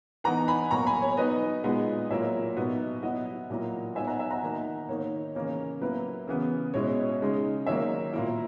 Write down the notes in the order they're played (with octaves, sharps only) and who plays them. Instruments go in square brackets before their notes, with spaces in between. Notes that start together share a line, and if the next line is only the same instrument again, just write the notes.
[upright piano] E3 B3 D#4 F#5 A#5
G#5 B5
B2 F#3 A#3 A#5 C#6
G#5 B5
C#5
F#3 B3 D#4 B4 D#5
A#2 G#3 B3 D#4
A#2 F#3 A#3 E4 C#5 E5
B2 F#3 B3 D#4
F#3 B3 E4 D#5 F#5
A#2 F#3 A#3 E4
F#3 B3 D#4 E5 G#5
F#5 A#5
E5 G#5
F#5 A#5
D#3 A#3 D#4
D#3 A#3 D#4 C#5
C#3 E3 A#3 C#4
F#3 A#3 E4 B4
C#3 E3 B3
B2 G#3 C#4 E4 C#5
C#3 G#3 D#4
D#3 F#3 A#3 C#5 E5
A#2 A#3 E4